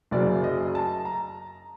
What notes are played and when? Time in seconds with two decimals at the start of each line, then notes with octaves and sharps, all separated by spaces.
0.11 F#1 F#2 C#3 D5
0.44 D#5
0.75 A5
1.05 A#5